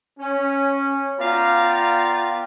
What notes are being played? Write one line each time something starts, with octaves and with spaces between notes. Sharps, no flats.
C#4
B3 F4 D5 F5 G5 A#5